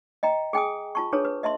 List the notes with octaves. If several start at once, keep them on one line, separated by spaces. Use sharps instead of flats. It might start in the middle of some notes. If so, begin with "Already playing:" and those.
D#5 G5 A#5
G#4 G5 G#5 D#6
F4 A5 C#6
D4 G#4 A4 B4 C#5
B4
D#5 E5 A5 C6